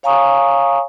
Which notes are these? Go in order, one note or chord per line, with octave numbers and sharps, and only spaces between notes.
C#5 F5 G#5 A#5 C#6 D#6